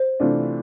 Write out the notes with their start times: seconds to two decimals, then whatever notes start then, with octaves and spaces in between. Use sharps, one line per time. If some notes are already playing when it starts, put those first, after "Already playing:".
Already playing: C5
0.20 C3 E3 A3 D4 F4